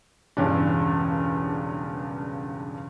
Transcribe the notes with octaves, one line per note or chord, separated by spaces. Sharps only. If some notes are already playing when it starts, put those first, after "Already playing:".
E1 E2 G2 C#3 C#4 D4